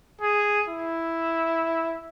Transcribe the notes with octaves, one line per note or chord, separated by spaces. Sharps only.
G#4
E4